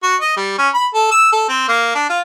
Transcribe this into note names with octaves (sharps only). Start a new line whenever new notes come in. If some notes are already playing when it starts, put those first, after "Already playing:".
F#4
D#5
G3
C#4
B5
A4
E6
A4
C4
A#3
D4
F4